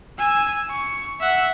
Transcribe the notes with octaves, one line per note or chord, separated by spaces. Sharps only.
G#5 E6
C#6
E5 F#5